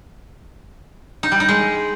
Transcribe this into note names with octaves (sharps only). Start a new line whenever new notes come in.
D#4
G3
D#4
G#3